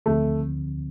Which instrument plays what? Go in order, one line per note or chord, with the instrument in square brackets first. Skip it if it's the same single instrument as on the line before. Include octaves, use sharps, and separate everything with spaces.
[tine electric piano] D2 D3 F3 C4 [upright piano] A3